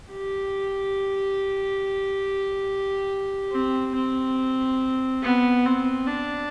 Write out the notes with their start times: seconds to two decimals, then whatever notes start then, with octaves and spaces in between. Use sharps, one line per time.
0.11 G4
3.52 C4
3.95 C4
5.23 B3
5.66 C4
6.08 D4